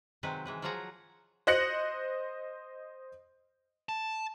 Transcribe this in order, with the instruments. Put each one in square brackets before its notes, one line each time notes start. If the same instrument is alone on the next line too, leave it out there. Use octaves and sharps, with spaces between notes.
[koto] C3 D#3 F#3 G#3 C4 B4
E3 G#3 B4
F3 F#3 F4 G#4 F#5 A#5
[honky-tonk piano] C5 D#5 F#6 A#6 C#7 F#7
[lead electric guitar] A5